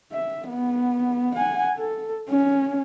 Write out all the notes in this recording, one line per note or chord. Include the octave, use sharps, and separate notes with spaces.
E5
B3
F#5 G#5
A4
C#4